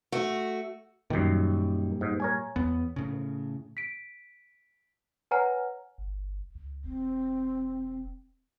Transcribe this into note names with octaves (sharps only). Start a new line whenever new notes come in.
A3 F#4
F#2 A#2 D#3 G3
G#2
A#4 C#5 G#5
E2 B3
A2 C#3
B6 D7
B4 C#5 F#5 G#5 A#5 F6
G1
C#2
E1 C4